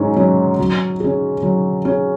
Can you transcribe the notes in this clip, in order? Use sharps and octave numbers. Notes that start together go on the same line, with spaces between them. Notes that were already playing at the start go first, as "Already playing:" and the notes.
Already playing: G#2 F#3 C#4
F#3 C#4
F#3
C#4 G#4
F#3
C#4 G#4